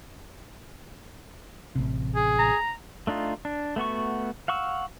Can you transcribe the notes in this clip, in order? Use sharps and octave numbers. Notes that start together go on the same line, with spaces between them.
A1 C3
G#4
A#5
A3 D4 D#4 F4
D4
A3 B3 F#4 C#6
F5 F#5 C#6 E6